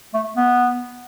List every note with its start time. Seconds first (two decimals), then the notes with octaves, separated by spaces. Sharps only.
0.14 A3
0.37 B3